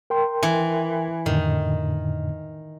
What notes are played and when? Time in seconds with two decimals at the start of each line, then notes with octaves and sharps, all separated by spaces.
0.10 A#4 G5 C6
0.43 E3
1.26 F2 A2 D3 D#3